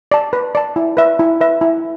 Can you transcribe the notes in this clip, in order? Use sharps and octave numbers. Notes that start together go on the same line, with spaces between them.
D5 A5
B4
D5 A5
E4
B4 E5
E4
B4 E5
E4